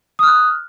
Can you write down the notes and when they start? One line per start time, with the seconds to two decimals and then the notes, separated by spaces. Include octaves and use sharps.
0.19 D#6
0.23 F6
0.27 F#6